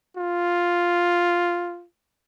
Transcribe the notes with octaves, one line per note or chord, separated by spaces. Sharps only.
F4